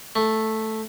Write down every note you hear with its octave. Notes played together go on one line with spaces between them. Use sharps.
A3